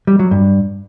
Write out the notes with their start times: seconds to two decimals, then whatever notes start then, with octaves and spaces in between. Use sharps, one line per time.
0.07 G3
0.19 F#3
0.31 G2